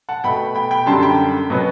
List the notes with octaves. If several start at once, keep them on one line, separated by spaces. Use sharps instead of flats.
F#5 A5
B2 A3 G5 B5
G5 B5
G5 B5
F#2 D3 G3 A5 C6
G5 B5
B2 F#3 B3